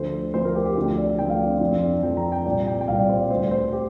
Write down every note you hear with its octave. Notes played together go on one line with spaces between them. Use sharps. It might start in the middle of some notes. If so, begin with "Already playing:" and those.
Already playing: D2 D3 F3 C5
D2 D3 F3 C5
A#4
G4
G4
D2 D3 F3
D5
D2 D3 F3 G5
F5
D4
C4
F2 F3 D4
C4
D4
F4
F2 F3 G5
A#5
G5
C2 A#2 G3 D5
G5
G5
C2 A#2 G3 F5
D5
C5
D5
D2 D3 G3 C5
C5
G4